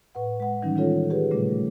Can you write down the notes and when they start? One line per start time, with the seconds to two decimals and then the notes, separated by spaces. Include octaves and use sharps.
0.15 A2 B4 F#5
0.40 G#3 F#5
0.62 D#3 E3 G3 C#4 D#4
0.76 D#3 G#3 C#4 F4 A4 C#5
1.10 G4 G#4 B4
1.31 A#2 C#3 G3 A3